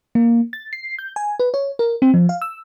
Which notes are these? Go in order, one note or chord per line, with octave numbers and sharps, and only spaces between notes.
A#3
A6
C7
G6
G#5
B4
C#5
A#4
C4
F3
F5
E6